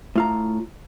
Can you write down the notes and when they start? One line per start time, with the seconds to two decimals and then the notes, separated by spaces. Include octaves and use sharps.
0.16 A2 F4 A#5